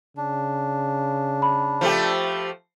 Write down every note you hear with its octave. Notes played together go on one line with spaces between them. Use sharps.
C#3 D4
B5
F3 A3 G4